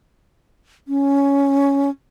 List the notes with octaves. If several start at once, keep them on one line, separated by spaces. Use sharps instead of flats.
C#4